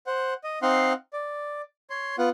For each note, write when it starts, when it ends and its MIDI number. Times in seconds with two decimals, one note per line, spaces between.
0.06 0.34 72
0.06 0.34 78
0.44 0.59 75
0.62 0.93 60
0.62 0.93 63
0.62 0.93 77
0.62 0.93 78
0.62 0.93 84
1.13 1.62 74
1.90 2.16 73
1.90 2.16 84
2.18 2.29 59
2.18 2.29 65
2.18 2.29 78